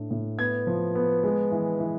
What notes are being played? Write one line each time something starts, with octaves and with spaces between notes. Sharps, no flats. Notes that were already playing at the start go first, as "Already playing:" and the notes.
Already playing: A2 D4
A2
B3 G#6
F3
B3
G#3
E3
E3